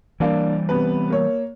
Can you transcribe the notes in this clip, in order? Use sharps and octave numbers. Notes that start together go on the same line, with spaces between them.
E3 G3 A#3 D4 F5
C3 B3 B4
A#3 C#5